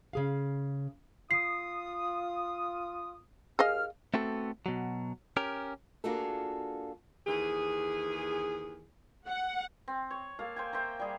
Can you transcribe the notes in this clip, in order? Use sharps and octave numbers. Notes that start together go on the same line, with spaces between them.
C#3 G#4 F5
F4 D#6 C7
D#2 G#4 D#5 F5 F6
A3 B3 C4 F#4 A4
B2 F#3
C#4 G4 A#4
A#3 D4 F4 F#4 G#4 A4
D#2 E3 G#4
F#5
C4
C#5
A#3 A4 F5
C5 G5 G#5
C5 E5 G5 A#5
G3 G#4